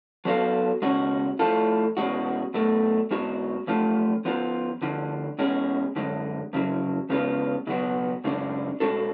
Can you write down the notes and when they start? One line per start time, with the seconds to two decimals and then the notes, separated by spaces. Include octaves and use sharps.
0.25 F#3 B3 F#4 A4 F5
0.82 C#2 B2 G#3 C#4 F#4
1.39 A2 F3 A3 F4 A4
1.97 B2 G#3 C#4 F#4
2.54 B1 B2 A3
3.11 G#2 G#3 B3 F#4
3.67 F#2 F3 A3 F4
4.25 F3 B3 F4
4.82 D2 D3 F3
5.39 B2 G#3 C#4 G#4
5.96 F#2 D3 G#3
6.53 F2 C#3 F#3
7.09 F2 C#3 G#3 B3 F4
7.67 C#2 B2 F#3 B3 F#4
8.24 F#2 C#3 G#3 D4
8.80 B2 G#3 D4 F#4 A4